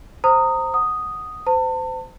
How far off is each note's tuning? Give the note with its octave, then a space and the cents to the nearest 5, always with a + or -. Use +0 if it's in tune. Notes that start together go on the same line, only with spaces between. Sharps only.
C5 +0 A#5 -25 D#6 +0
F#5 +5 D#6 +0
C5 -35 A5 +35